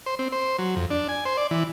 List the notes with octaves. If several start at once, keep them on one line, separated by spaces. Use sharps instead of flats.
C5
C4
C5
F#3
F2
D4
G#5
C5
D5
E3